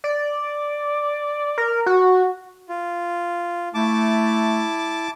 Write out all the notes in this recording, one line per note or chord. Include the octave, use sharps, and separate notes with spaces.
D5
A#4
F#4
F4
A3 E4 A5 D6